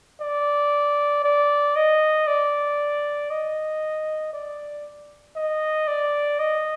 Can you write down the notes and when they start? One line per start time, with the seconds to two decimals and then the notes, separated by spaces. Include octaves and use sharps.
0.21 D5
1.24 D5
1.76 D#5
2.27 D5
3.30 D#5
4.33 D5
5.36 D#5
5.87 D5
6.39 D#5